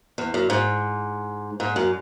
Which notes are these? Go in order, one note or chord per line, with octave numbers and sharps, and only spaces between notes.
E2
F#2
G#2
G#2
F#2